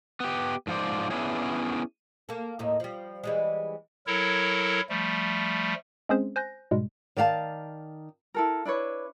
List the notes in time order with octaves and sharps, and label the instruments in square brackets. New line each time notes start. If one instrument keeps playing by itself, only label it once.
[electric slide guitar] B3 G4
G#2 F3 F4 C5 D5
B3 C#4 D4 E4 G#4 C#5
[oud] A#3 A4
D#2 A2 D#3
F3 G3
E3 G3 G#3
[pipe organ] F#3 E4 A4 A#4 C#5
F3 G3 A3
[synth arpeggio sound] G#3 C4 C#4 G#4 C5
C5 G#5 F#6 G6 A#6
G#2 B2 G3 G#3
[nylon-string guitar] D#3 D5 F5 F#5 A5
[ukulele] E4 A4 A#4
D4 E4 B4 C#5